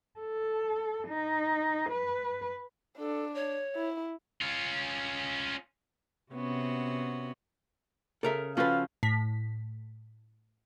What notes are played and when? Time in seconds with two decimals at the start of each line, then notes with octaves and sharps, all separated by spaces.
0.20 A4
1.08 D#4
1.90 B4
2.98 D4 A4
3.34 C#5
3.76 E4
4.42 C#4 F4
6.32 C3 B3 C#4 F#4
8.23 C#3 A4 A#4 E5
8.57 F3 C#4 F#4 A4 B4 F5
9.03 A2 B6